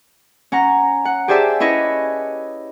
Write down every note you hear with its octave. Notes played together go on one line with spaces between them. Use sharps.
C#4 F#5 A#5
F#5
G4 G#4 C5 D5 E5 A5
C#4 E4 B4 C#5 D#5